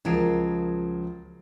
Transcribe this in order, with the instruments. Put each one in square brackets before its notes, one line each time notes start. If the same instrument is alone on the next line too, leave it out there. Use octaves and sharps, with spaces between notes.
[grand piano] C#2 F3 D7 [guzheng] F#3 A#3 G#4